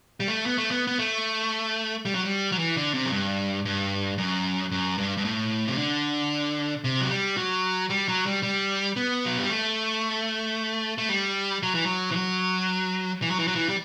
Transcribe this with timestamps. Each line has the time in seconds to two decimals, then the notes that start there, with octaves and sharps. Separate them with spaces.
0.20 G3
0.28 A3
0.46 B3
0.58 A3
0.71 B3
0.87 B3
0.99 A3
2.05 G3
2.15 F#3
2.25 G3
2.52 F#3
2.58 E3
2.76 D3
2.94 C3
3.05 F#2
3.12 G2
3.65 G2
4.18 F#2
4.71 F#2
4.98 G2
5.17 G2
5.25 A2
5.67 C3
5.78 D3
6.84 C3
7.01 F#3
7.11 G3
7.37 F#3
7.90 G3
8.08 F#3
8.26 G3
8.43 G3
8.96 B3
9.26 F#3
9.38 G3
9.49 A3
10.98 A3
11.09 G3
11.63 F#3
11.74 E3
11.86 F#3
12.11 E3
12.16 F#3
13.22 E3
13.30 F#3
13.39 E3
13.47 F#3
13.55 E3
13.69 G3